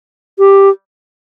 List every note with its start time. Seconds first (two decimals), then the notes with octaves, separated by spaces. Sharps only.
0.39 G4